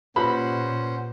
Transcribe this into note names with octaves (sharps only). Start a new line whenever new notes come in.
A#2 C#4 F4 G4 B4 C5 F#5 B5